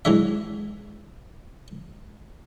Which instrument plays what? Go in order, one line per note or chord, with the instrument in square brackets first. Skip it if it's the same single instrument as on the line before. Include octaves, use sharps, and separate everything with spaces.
[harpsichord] E3 F#3 G#3 D4 E5